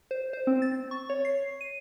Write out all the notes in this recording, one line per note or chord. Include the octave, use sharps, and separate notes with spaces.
C5
C5
C4
A6
C#6
C#5
C7
D#7